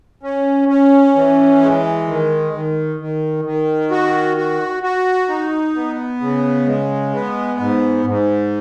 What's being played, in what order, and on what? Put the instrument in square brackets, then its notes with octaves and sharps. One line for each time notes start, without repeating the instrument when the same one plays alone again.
[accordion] C#4
C#4
E3
G#3
D#3
D#3
D#3
D#3
F#4
F#4
F#4
D#4
B3
C#3
G#3
B3
G#2
G#2